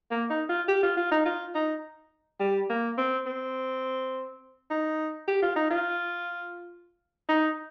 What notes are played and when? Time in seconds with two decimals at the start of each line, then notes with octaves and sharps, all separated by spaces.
0.11 A#3
0.30 D#4
0.49 F4
0.68 G4
0.83 F4
0.97 F4
1.11 D#4
1.25 F4
1.55 D#4
2.40 G3
2.70 A#3
2.98 C4
3.26 C4
4.70 D#4
5.28 G4
5.42 F4
5.56 D#4
5.70 F4
7.29 D#4